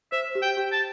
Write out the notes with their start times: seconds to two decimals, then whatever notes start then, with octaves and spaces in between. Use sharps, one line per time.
0.12 C5 E5
0.35 G4
0.42 G5
0.57 G4
0.72 A5